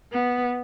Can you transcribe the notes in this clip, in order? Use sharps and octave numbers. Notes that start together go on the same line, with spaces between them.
B3